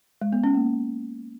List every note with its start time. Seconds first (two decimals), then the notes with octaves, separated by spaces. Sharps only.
0.21 G#3
0.33 B3
0.44 C#4
0.55 A#3